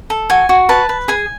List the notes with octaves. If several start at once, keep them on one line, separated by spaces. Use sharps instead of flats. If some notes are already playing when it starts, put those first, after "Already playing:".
A4
F#4 G#5
F#4
B4 A5
B4
G#4 G#5